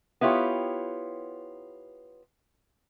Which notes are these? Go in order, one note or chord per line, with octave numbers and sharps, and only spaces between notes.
B3 E4 F4 G4 C#5